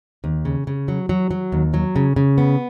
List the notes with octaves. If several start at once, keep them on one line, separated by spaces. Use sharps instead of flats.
D#2
C#3
C#3
F#3
F#3
F#3
D#2
F#3
C#3
C#3
B3